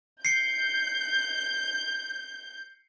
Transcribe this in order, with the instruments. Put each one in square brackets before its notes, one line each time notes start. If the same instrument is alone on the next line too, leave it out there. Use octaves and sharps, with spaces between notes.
[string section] G6 [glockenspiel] C7 C#7